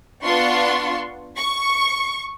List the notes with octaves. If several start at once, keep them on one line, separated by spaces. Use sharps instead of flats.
B3 D4 F4 C6 C#6
C#6